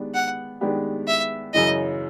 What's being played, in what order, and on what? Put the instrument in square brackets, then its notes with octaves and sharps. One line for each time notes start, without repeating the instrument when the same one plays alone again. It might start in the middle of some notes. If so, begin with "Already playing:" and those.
Already playing: [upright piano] D#3 G#3 B3 D4 G4
[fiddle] F#5
[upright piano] D#3 G#3 B3 D4 G4
[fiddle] E5
[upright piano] F#2 C#3 E3 [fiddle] D#5